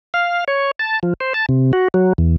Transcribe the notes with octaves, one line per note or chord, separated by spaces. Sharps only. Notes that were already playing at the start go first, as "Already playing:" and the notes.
F5
C#5
A5
F3
C5
A5
C3
F#4
F#3
E2